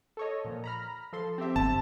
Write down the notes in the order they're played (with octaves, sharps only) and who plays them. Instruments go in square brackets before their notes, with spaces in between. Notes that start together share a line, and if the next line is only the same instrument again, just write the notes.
[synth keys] A4 C#5 D#5
A#2 F3
A#5 B5 F6
F3 A4 C6
C4 G4 E5
[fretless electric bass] G1 [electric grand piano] A5